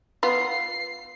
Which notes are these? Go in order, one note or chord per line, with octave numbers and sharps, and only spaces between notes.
B3 F4 C7